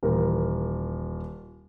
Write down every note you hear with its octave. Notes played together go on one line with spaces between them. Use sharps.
D#1 E3 A#4